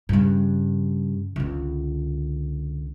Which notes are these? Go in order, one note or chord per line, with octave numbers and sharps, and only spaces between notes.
G2 C#3
C#2 D3